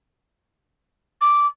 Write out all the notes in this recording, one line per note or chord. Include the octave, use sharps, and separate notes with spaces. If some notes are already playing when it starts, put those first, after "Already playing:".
D6